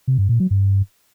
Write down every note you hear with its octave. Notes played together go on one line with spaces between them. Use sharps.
C3
G2
A#2
F#3
G2